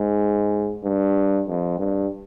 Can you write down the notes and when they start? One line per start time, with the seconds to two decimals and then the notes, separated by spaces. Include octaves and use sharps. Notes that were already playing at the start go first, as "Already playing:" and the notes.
Already playing: G#2
0.84 G2
1.48 F2
1.79 G2